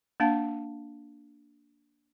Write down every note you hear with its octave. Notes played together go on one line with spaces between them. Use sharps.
A#3 D4 F5 A5